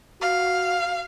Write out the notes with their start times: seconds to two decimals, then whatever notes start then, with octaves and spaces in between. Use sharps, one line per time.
0.22 F#4 F5